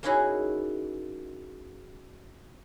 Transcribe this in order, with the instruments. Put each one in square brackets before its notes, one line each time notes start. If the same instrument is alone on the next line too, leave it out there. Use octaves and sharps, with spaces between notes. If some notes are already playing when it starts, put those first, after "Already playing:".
[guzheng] A#3 C#4 D#4 E4 F#4 G#4